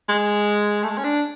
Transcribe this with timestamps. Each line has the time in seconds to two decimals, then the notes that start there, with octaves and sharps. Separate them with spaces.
0.09 G#3
0.83 A3
0.89 G#3
0.98 C#4
1.04 D4